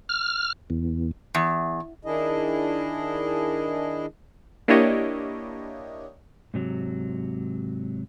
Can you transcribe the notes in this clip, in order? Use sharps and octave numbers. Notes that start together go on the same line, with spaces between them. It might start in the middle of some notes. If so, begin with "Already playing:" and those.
F6
E2
E2
D#3 D4 E4 G#4 D#5
A#3 D4 E4 G4 C#5 D#5
G#2 C3 F#3